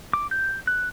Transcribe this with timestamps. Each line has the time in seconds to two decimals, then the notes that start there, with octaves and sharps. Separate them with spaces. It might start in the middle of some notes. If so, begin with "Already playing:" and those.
0.13 D6
0.31 G6
0.67 F#6